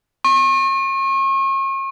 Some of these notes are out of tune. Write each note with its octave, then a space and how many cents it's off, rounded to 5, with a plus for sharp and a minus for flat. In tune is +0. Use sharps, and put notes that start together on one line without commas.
C#6 -40